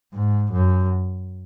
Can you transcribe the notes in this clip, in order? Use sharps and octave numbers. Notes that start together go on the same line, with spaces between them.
G#2
F#2